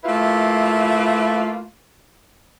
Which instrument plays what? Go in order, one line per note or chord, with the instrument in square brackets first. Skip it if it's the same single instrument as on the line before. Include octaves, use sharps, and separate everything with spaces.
[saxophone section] A3 A#3 E4 F4 B4